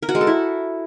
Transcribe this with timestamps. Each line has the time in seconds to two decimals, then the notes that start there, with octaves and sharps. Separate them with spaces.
0.02 A#4
0.09 F#4
0.15 G#3
0.21 A4
0.27 E4